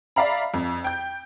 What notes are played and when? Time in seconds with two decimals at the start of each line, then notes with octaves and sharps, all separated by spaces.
0.16 D5 E5 F5 A#5 B5
0.54 F2
0.84 G5 G6